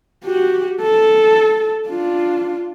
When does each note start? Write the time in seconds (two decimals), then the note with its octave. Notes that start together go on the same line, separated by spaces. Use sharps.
0.25 F#4 G4
0.81 A4
1.87 D4 F4